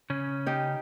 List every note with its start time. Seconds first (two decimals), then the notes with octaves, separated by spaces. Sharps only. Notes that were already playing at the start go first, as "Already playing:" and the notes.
0.10 C#3 C#4
0.46 D#4 G4